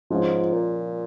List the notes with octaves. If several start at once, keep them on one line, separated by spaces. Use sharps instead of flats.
G#2 F3 G#3 C#4 F4
A#2